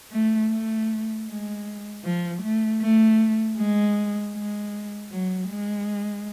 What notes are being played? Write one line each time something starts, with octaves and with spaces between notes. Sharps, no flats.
A3
A3
G#3
F3
A3
A3
G#3
G#3
F#3
G#3